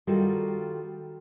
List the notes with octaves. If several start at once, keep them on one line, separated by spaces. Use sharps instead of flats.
D#3 G3 F4 F#4 A4